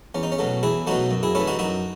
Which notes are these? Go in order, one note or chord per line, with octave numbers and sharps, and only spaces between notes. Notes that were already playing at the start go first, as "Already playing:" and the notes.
E2 C#4
D#4
C#4
B2 F#3 A3
E2 E4 G#4
B2 F#3 A3 D#4 F#4
F#2
E4 G#4
E3 A3 C#4 E4
D#4 F#4
F#2 D#4 F#4